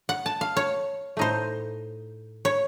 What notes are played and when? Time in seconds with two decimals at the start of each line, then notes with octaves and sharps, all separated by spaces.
0.09 F#5
0.26 A5
0.41 F5
0.57 C#5
1.17 A2 A3 D#4 C5
2.45 C#5